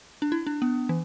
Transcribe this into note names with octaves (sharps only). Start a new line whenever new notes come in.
D4
E4
D4
B3
E3